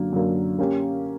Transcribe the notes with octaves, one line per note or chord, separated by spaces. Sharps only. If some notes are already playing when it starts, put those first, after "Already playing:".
Already playing: F#2 D3 F#3 A#3
F#2 D3 F#3 A#3
A#3 C#4 G4